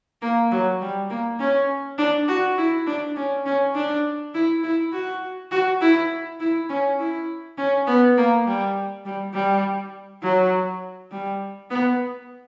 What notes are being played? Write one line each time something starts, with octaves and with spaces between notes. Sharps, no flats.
A#3
F#3
G3
A#3
C#4
D4
F#4
E4
D4
C#4
C#4
D4
E4
E4
F#4
F#4
E4
E4
C#4
E4
C#4
B3
A#3
G3
G3
G3
F#3
G3
B3